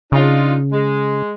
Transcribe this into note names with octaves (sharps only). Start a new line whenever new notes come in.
C#3 D4 D#4 F4
G#3